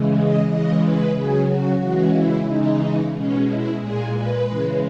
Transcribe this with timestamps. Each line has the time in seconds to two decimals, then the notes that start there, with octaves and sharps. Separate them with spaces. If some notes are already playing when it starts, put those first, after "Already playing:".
Already playing: C#3 E3 G#3
0.15 D#5
0.49 C#3 E3 G#3 D#5
0.82 B4
1.14 C#3 F#3 G#4
1.48 F#4
1.81 C#3 E3 G#3 F#4
2.14 E4
2.47 C#3 E3 G#3 D#4
3.14 B2 G#3 C#4
3.46 E4
3.79 A#2 G#3 G#4
4.12 B4
4.46 C#3 E3 G#3